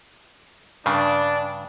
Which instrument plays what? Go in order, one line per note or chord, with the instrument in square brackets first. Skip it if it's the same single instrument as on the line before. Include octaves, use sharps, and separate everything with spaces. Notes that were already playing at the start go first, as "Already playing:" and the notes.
[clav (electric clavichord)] G2 C#3 [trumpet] D4